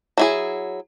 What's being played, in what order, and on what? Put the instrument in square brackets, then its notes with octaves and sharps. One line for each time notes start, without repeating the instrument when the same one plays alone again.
[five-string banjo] F#3 E4 G#4